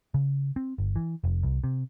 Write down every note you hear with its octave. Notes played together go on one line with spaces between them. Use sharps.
C#3
C4
G1
E3
F1
C2
C3